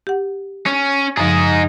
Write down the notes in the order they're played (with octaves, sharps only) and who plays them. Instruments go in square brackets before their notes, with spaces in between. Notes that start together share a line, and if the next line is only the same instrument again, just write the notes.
[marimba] G4 F#5
[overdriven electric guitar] C#4
[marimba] F#2 C#3 F3 [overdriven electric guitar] D#4 G#4